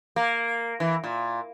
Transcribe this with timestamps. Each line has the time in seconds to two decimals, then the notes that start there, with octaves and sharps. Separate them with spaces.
0.16 A#3
0.80 E3
1.04 A#2